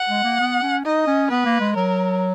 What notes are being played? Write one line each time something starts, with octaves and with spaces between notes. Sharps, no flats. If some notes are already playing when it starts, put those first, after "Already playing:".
Already playing: F#5
G#3
A#3
B3
C#4
D#4 D#5
C#4
B3 B4
A#3
G#3
F#3 A#4